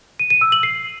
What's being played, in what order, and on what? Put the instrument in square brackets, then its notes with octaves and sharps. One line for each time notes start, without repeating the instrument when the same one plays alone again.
[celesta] D#7
D#7
E6
F#7
C7